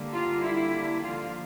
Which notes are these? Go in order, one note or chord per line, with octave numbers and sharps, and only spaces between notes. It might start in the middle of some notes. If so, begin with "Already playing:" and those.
Already playing: D3 G3 A#3
F4
E4
D3 F3 A#3 F4